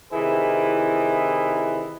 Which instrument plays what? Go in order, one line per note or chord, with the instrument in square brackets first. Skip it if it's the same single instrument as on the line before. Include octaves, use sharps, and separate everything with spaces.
[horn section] C3 D#3 E3 E4 G#4 B4